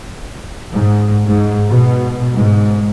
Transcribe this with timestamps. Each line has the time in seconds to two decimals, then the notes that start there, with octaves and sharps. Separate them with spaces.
0.74 G#2
1.26 G#2
1.69 B2
2.36 G#2